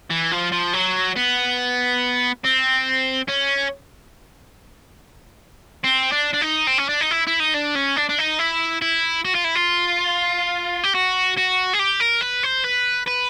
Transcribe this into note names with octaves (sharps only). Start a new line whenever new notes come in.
E3
F3
F3
F#3
B3
C4
C#4
C4
D4
D4
D#4
C4
C#4
D4
D#4
E4
E4
D#4
D4
C#4
D4
D4
D#4
E4
E4
F#4
F4
E4
F4
G4
F#4
F#4
G#4
G4
A#4
B4
C5
B4
B4